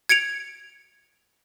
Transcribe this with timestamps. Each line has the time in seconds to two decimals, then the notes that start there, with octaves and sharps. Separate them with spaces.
0.09 G#6 C#7 D7 F7